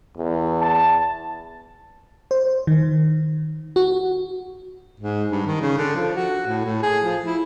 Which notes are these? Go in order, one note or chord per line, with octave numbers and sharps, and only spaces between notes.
E2
A5
C5
D#3
F#4
G#2
G2
D#3
C#3
D3
F3
F#4
A2
A2
G#4
F3
E4